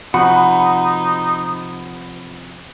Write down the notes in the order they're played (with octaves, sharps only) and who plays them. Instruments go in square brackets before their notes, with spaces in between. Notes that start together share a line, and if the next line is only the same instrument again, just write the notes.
[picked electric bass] C3 F3 [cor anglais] D#4 [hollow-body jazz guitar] F#4 [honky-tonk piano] B5